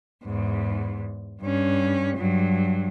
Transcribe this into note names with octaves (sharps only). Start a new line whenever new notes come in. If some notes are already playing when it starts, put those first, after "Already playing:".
E2 G#2
G2 C#4
G2 F#3